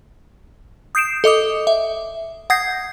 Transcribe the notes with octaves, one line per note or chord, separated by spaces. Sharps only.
D#6 G6 C7 D7 E7
A4 D#5 D6 D#6
E5
F#5 D#6 G6 G#6 A#6 C7